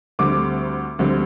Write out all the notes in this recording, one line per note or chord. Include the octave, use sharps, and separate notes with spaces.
D2 D3 G3 C4 D6
D2 D3 G3 C4